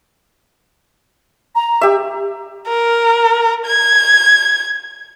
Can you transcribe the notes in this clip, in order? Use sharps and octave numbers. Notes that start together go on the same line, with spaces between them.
A#5
G4 E5
A#4
G#6